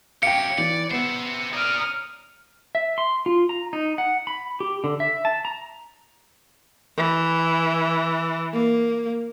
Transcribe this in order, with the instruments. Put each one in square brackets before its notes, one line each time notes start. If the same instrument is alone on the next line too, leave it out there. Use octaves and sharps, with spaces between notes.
[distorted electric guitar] F#2 G4 [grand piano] F5 G5 [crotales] C#7
[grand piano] E3 [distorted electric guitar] D5
[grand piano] B3 [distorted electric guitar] C5 E5
[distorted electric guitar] A#4 D5 [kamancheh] D#6 F6
[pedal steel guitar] E5
C6
F4
A#5
D#4
F#5
B5
G4
D3
E5
A5
A#5
[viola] E3
A#3